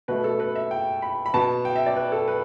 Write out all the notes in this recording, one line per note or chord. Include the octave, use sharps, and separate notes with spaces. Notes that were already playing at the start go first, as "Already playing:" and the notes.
B2 A3 B4
A4
B4
E5
G5
B5
B5
B2 B3 A5
G5
E5
D5
B4
A4
B4